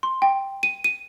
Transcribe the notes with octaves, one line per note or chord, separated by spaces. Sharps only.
C6
G5
D#7
D#7